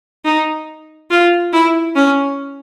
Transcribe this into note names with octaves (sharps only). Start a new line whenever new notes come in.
D#4
F4
E4
C#4